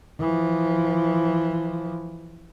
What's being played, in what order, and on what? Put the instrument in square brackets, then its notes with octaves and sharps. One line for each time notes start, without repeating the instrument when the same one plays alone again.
[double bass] E3 F3